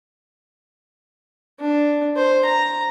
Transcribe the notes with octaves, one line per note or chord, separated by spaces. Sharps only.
D4
C5
A#5